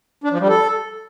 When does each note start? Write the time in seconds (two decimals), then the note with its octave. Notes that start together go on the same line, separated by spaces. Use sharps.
0.24 D4
0.32 F3
0.40 G3
0.49 A4